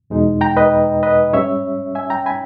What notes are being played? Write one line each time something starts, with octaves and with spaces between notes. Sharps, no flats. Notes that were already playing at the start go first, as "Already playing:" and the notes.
E2 B2 G#3 D#4
G5 A#5
B4 D#5
B4 D#5
G#2 G3 C#4 C#5 E5
E5 G#5
G5 A#5
G#5 B5